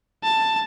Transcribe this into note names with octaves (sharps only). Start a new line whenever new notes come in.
A5